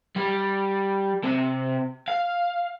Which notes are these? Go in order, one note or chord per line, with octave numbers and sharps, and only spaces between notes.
G3
C3
F5